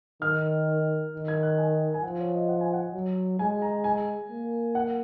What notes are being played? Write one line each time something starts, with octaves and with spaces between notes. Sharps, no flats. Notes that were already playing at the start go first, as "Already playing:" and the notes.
D#3 F6
D#3
G#6
F#6
G#5
G#5
F3 F#5
C#5
D#5
F#5
G#5
F#5
F#3
G#3 G#5
A#5
G#5
A#3
F#5